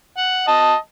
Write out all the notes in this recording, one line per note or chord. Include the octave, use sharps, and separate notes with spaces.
F#5
D#5 A5